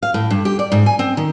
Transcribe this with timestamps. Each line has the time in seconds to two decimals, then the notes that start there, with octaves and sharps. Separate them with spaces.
0.02 F5
0.14 A2
0.30 G2
0.45 G4
0.59 D5
0.72 G#2
0.86 G#5
0.99 C4
1.17 D#3